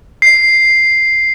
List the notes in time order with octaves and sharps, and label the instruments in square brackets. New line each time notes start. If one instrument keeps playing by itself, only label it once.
[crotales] C7